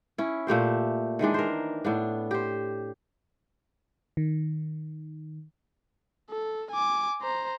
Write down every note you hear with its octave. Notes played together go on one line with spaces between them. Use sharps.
C#4 E4
A#2 A3 G4 C5
D#3 E3 G#3 D4
A#4 C5
A2 B3 D4
G4 C5
D#3
A4
G#5 D6
C5 A#5